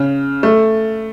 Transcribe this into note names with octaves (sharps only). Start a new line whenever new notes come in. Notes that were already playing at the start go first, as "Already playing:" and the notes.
Already playing: C#3
A3